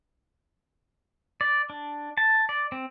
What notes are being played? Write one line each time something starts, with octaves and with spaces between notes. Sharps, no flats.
D5
D4
A5
D5
C4